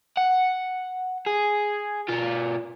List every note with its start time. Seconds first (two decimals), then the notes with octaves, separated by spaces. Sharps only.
0.17 F#5
1.27 G#4
2.09 B2 F4